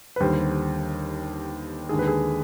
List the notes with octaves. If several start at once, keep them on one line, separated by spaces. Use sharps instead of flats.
B4
D#2 D3 G3 C5
D#2 D3 G#3 G#4
B4
G#4